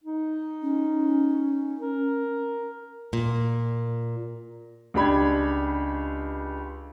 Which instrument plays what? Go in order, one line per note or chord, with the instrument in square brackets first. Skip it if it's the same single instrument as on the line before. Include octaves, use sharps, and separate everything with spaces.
[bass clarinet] D#4
[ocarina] C#4
[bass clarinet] A#4
[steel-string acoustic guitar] A#2
[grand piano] C#2 D4 G4 B5 G#6